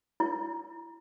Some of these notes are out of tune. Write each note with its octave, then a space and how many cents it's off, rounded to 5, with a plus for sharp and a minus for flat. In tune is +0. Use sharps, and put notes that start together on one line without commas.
E4 +20